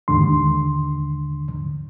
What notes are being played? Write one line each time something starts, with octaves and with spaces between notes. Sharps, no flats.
D#2 G#2 D3 C6